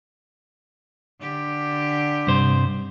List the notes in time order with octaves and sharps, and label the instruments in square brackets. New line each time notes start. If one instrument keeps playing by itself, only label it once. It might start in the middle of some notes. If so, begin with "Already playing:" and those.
[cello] D3 G4
[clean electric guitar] G2 C3 C5